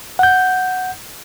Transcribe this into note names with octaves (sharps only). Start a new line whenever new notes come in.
F#5 G6